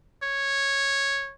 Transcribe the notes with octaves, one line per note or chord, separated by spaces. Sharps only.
C#5